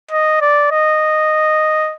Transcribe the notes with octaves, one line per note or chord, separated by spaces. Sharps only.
D#5
D5
D#5